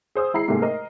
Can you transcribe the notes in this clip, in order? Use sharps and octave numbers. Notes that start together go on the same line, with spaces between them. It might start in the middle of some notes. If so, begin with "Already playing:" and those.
G#4 C5 D#6 E6
G#3 E4 A#5 C7
G#2 C3 A3 A#3 G4 G#4
A#4 D#5